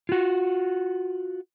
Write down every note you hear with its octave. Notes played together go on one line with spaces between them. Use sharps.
F4 F#4